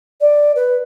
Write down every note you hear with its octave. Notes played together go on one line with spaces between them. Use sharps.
D5
B4